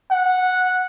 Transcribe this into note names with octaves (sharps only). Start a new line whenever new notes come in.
F#5